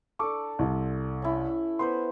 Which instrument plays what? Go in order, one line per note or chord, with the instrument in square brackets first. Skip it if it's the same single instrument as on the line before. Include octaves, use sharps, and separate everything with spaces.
[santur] D4 A4 [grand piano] C#6 D6
[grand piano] C2
[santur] C#4 E4
[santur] B3 B4 C5 [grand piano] C6